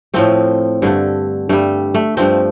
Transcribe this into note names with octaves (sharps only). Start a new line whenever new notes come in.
A2 F3 A3 C4
G2 D3 A3
G2 G3 A3
A3
G2 F3 A3 C4